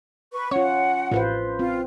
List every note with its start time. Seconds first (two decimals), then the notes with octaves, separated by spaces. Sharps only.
0.32 B4 C#6
0.51 C#4 F4 C#5 F#5
1.12 A1 F4 B4 C5
1.59 C4 F4